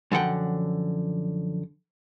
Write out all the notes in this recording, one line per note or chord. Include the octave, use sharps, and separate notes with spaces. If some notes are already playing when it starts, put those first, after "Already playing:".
F#2 D3 F3 F#5 G5